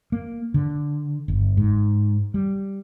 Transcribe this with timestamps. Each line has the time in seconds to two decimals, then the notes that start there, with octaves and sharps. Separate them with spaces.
0.12 A#3
0.54 D3
1.28 G1
1.57 G#2
2.34 G3